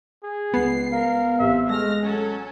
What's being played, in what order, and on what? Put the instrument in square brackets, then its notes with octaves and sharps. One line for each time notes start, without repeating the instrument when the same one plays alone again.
[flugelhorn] G#4
[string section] C#2 C7 [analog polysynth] B3
[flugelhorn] A#4 [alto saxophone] F5
[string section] A1 C3 [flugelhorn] E5
[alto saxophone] G#3 [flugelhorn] A3 [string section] F6 A#6
[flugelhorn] F#3 [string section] C#4 A4